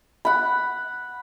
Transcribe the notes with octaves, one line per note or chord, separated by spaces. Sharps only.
F#5 B5